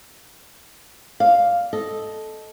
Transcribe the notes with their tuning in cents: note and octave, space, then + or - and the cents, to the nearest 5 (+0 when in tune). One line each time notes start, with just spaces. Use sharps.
D5 +0 F5 +0
A4 -10 D#5 +0